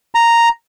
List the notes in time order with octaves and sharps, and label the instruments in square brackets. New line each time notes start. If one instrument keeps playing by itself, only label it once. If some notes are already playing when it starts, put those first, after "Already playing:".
[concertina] A#5